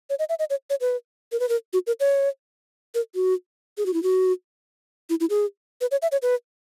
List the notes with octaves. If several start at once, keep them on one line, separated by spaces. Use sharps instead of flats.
C#5
D#5
E5
D#5
C#5
C#5
B4
A#4
B4
A#4
F#4
A#4
C#5
A#4
F#4
G#4
F#4
E4
F#4
E4
E4
G#4
B4
C#5
E5
C#5
B4